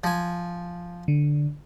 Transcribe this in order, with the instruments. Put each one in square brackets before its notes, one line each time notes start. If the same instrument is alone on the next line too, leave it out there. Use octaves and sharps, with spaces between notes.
[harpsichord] F3 G#5
[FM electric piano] D3